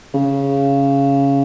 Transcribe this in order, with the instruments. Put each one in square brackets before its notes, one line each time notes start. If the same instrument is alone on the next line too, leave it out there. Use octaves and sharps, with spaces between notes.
[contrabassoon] C#3